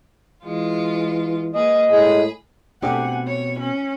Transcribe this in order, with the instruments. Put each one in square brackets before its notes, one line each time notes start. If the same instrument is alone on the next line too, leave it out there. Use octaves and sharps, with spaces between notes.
[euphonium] E3 [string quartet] G#3 F4
[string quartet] A#3 G#4 B4 [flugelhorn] D#5
[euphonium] A2 [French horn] G#3 [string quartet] G#4 B5
[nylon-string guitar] B2 C4 [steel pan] A3 D4 G4 [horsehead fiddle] F#5 G#5
[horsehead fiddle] C#5
C#4